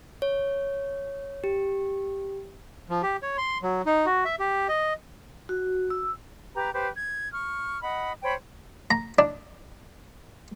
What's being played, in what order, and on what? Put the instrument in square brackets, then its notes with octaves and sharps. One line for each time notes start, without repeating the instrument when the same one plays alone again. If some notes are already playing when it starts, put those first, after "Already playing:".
[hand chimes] C#5
G4
[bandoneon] F3
G4
C#5
C6
F#3
D#4
F#4
E5
G4
D#5
[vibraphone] F#4
E6
[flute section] G4 B4 A#5
G4 B4 C5
G#6
C#6 F6
D#5 F#5 B5
C5 C#5 G5 B5
[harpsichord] A#5
D4